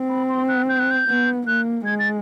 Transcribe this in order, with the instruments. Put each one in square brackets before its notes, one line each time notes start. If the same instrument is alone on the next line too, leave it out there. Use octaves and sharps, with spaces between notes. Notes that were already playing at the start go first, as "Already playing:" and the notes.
Already playing: [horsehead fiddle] C4
[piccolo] B5
C6
F#6
G6
F#6
G6
[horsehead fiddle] B3
[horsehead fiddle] A#3 [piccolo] F#6
[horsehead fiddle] G#3 [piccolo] G#6
[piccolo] A6